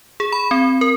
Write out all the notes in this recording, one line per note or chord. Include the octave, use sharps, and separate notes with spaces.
G#4
B5
C4
A#4